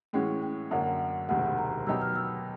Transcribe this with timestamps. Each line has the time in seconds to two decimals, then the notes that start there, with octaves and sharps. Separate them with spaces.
0.13 A2 E3 G#3 C#4 F#4 G5
0.43 G5
0.71 F#2 D3 F#3 A#3 D4 F#5
1.29 E1 D2 C3 D#3 F#5
1.58 A#5
1.87 B2 F#3 B3 D#4 G4 E6
2.02 F6
2.16 E6